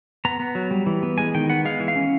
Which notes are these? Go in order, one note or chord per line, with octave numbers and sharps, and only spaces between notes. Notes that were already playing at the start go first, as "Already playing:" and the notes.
B3 A#5
B3
F#3
G3
E3
B3
G#3 G#5
D#3 G5
B3 F#5
G#3 F5
E3
F5
C#4